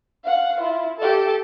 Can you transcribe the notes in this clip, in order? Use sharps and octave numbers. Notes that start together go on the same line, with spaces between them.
F5 F#5
E4 F4
G4 A4